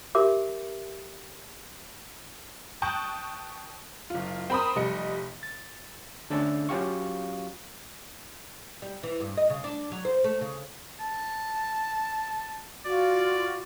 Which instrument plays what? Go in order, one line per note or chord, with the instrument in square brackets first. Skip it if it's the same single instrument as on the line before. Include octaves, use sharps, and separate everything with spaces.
[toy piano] G4 A#4 E5 D6
[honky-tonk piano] G5 A5 C#6 D#6 F#6 G6
F#1 F4
C4 A#4 B5 C6 D#6
F1 G3 D#5 C#7
[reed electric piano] A6
D3 A3 C#4 D4 E6 A6
F#3 C#4 F4 G4 F5 C#6
[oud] G3
E3
G2
D#5
C#3
D4
F#3
C5
A3
C#3
[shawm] A5
[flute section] F4 F#4 [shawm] D5